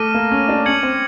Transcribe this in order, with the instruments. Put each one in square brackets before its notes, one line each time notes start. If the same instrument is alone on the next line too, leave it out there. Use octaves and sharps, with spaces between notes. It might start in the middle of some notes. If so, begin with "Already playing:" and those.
Already playing: [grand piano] A3 [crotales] D6 F6 A#6 D#7
[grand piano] A#3
C#4
D4
[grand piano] C#4 [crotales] G#6 C#7 F#7
[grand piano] C4